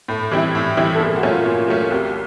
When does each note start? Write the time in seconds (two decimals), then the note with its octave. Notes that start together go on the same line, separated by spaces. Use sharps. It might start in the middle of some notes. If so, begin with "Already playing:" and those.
0.08 A2 A4
0.31 E3 G3 C4 E4
0.55 A2
0.77 E3 G3 C4 E4
0.95 A4
1.00 A#2 G#4
1.15 F#4
1.23 F#3 A3 C#4
1.30 F4
1.46 A#2 F4
1.68 F#3 A3 C#4
1.91 C2 G4